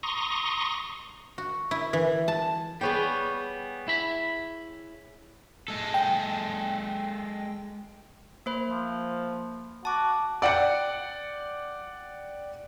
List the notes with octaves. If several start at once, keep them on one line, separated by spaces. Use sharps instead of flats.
A#5 C6 C#6 D#6
F#4
E4
E3
A5
G3 B3 G#4 C#5 G5
E4 B5
G#3 A4
G5
A#3 C5 B5
F3
F#4 A5 D6
D5 F#5 G5 C#7